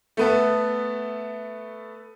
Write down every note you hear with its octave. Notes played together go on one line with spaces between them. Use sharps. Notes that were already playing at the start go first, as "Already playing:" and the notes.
A3 B3 A4